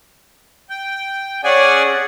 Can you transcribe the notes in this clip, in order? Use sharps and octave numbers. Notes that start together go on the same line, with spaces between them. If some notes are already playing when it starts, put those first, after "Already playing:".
G5
C#4 G#4 D5 F#5 G#5